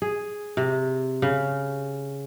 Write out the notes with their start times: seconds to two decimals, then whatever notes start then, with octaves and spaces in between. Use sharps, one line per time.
0.02 G#4
0.57 C3
1.22 C#3